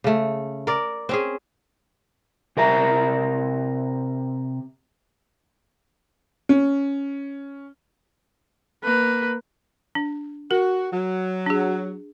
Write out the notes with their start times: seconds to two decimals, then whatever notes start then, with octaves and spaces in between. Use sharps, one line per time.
0.04 C#3 A3
0.67 A#4 D5
1.09 C4 C#4 G#4
2.57 C3 A#4 E5 A#5
6.49 C#4
8.84 A#3 B4
9.95 D4
10.51 F#4 A#4
10.92 F#3
11.46 D4 G#4